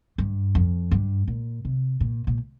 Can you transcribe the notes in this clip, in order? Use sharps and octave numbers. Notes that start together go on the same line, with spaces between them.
G2
F2
G2
A#2
C3
A#2
A#2